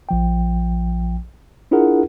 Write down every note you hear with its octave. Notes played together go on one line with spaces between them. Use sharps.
A#1 F3 G5
D4 E4 F4 G#4 A#4 F#5